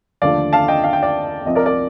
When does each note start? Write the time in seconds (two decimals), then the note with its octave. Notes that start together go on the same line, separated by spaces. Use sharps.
0.22 D#2 D3 F3 A3 D5 F5
0.53 F5 A5
0.68 D#5 G5
0.84 F5
0.93 G5
1.03 D5 F5
1.45 C2 C3 F3 D#5
1.55 A#4 D5
1.66 A#4 D5